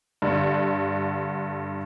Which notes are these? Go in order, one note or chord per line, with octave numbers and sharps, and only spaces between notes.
G2 D3